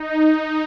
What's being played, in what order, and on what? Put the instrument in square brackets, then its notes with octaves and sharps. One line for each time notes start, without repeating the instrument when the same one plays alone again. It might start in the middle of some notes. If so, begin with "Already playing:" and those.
Already playing: [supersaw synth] D#4